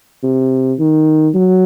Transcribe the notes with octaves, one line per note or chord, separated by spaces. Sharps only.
C3
D#3
F#3